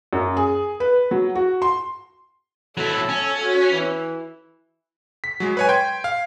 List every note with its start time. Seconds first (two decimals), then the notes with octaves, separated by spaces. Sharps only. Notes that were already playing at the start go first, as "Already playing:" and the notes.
0.13 F#2
0.37 G#4
0.80 B4
1.11 F#3
1.35 F#4
1.62 C6
2.77 F#3 E4 A4
3.09 C#4
3.45 F#4
3.75 E3
5.24 B6
5.40 F#3 G#3
5.57 B4 C#5 G#5
5.69 G5 C6 G#6
6.04 F5